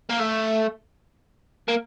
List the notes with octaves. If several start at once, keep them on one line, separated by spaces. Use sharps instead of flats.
A#3
A3
A#3